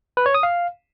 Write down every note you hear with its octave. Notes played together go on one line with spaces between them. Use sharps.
B4
C#5
D#6
F5